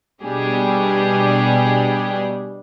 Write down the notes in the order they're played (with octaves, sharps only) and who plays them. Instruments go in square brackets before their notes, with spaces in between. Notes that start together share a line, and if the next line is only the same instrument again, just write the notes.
[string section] B2 G3 D4 G4 G#4